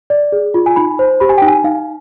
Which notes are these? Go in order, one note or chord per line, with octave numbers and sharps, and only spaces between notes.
D5
G#4
F4
G#5
D#4 B5
C5
G4 B5
G#5
G5
D#4
G#5
D#4 F5